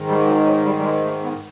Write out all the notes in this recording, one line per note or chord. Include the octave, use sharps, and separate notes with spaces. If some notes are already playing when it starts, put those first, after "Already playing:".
Already playing: G#2 D#3
G3
F#3
F#3
G3
G3
G#3
A3
B3